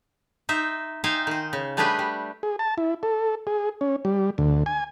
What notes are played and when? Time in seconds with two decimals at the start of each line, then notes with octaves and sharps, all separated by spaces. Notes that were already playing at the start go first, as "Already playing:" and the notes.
0.49 D#4 C5 E5
1.04 D#4 C5 E5 F5 G5 G#5
1.27 D#3 C5
1.53 C#3
1.77 G3 A3 D4 G4 G#4 B4
1.99 G3
2.43 G#4
2.59 A5
2.78 E4
3.03 A4
3.47 G#4
3.81 C#4
4.05 G3
4.38 D2
4.66 G#5